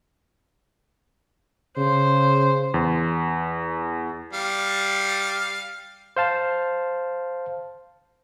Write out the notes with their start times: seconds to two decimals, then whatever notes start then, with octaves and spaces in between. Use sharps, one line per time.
1.78 C#3 C5
2.74 E2
4.33 G3 F5
6.17 C5 F5 A5